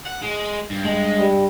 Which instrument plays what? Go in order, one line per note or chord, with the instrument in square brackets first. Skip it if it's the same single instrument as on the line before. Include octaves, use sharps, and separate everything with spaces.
[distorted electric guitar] F#5
G#3
G2
[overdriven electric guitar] G#3
[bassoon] G3